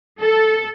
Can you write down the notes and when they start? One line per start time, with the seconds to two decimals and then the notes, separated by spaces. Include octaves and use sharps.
0.21 A4